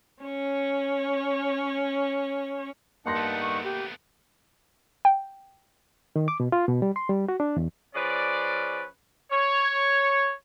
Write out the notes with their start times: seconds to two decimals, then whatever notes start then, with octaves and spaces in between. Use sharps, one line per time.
0.23 C#4 C#5
3.06 G2 A#3 D#4 F#5 A5 C6 A#6
3.17 A3 B3
3.41 C#6
3.64 G4
5.05 G5
6.16 D#3
6.28 D6
6.40 B2
6.52 F4
6.68 B2
6.82 G3
6.96 C6
7.09 G3
7.29 F#4
7.40 D4
7.57 E2
7.94 F3 C#4 G#4 B4 D5
9.31 C#5